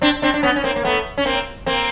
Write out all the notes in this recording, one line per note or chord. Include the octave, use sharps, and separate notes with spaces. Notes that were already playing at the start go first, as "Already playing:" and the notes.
C4 D4
C4 D4
D4
B3 C#4
C#4
A#3 C4
A#3
A3 B3
C#4
A#3 C4
A#3 C4